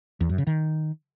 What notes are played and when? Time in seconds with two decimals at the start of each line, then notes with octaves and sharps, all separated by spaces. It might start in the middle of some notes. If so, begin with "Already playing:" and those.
0.21 E2
0.29 F#2
0.38 C#3
0.47 D#3